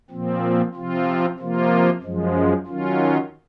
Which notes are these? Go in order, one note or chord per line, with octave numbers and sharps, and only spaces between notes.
A#2 F3 C4
C3 F3 C4 F4
C3 F3 A#3 F4
F#2 F3 G#3
D#3 F#3 C#4 F4